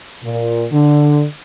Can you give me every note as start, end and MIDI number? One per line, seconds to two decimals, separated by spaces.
0.23 0.66 46
0.72 1.24 50